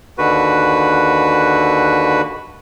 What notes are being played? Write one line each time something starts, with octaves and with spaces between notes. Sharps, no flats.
D#2 D3 F#4 B4